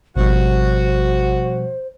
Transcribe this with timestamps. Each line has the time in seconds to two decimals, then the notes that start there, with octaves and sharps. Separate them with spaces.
0.16 G#1 B2 F3 G3 F#4 C5